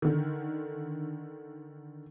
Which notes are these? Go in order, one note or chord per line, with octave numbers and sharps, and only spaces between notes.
D3 D#3